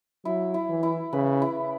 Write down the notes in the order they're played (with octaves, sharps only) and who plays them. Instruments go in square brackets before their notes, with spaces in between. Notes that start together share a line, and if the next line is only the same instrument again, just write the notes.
[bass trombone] F#3 [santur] E4
[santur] E4
[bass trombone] E3
[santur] E4
[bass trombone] C#3 [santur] B4
[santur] E4